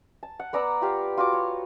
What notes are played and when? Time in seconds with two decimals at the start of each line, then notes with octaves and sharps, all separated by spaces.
0.23 A5
0.40 F#5
0.53 B3 D5 A#5 E6
0.81 F4 G4 F5
1.17 F4 F#4 D6
1.33 C#5